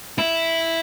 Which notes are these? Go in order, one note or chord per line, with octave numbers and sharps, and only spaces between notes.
E4